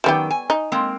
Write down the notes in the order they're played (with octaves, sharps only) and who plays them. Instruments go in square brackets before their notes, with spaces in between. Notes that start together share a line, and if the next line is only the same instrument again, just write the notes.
[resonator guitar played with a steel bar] F#2 D#3 G5 [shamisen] G3 B3 G4
[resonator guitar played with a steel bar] G#5
[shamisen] D#4
[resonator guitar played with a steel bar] G#3 A#3 C4